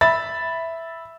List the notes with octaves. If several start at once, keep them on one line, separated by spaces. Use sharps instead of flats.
E5 B5 A6